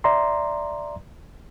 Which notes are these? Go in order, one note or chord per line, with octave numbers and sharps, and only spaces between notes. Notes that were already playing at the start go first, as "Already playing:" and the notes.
D5 E5 A#5 C6